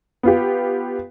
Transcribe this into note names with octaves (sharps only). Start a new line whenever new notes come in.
B3 F4 G4